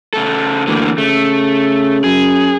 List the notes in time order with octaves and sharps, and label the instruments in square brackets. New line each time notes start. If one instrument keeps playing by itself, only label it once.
[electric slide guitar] C#3 A3 A4
[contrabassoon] D2 [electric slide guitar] D3 E3 A#3
[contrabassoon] C#3 [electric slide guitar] A3
[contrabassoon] F#2 [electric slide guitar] G#4